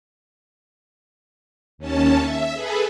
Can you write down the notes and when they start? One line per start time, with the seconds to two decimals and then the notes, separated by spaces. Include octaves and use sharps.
1.78 D#2 C#4 A5
2.19 E5
2.54 G#4 A4 B4